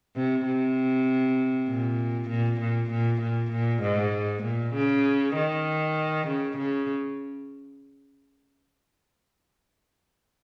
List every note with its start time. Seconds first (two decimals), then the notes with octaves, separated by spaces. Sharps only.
0.16 C3
0.46 C3
1.68 A#2
2.30 A#2
2.60 A#2
2.91 A#2
3.21 A#2
3.52 A#2
3.83 G#2
4.44 A#2
4.75 C#3
5.35 D#3
6.28 C#3
6.58 C#3